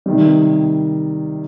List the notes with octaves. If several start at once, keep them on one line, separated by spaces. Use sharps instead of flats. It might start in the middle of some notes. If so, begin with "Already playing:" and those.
C3 D#3 G3